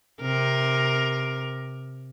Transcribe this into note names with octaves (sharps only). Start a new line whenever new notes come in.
C3 A#4